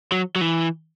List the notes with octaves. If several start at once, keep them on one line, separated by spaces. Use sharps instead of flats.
F#3
F#3
E3